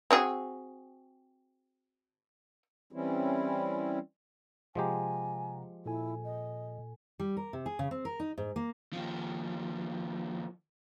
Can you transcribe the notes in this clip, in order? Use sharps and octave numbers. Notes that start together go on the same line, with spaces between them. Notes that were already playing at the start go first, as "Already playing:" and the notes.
C4 F#4 G#4
E3 G3 C4 C#4 E4
C3 F3 G#3 G4 F#5 G#5 A#5
A#2 E4 A4 G#5
D#5
G3
A#4
C3
G#4
C#3
C4
A#4
D#4
G#2
A#3
D#2 F3